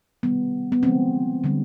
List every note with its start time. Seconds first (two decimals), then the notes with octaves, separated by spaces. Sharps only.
0.23 C3 D#3 G3 B3
0.72 B3
0.83 D3 F3 G#3 C4
1.44 D3 G3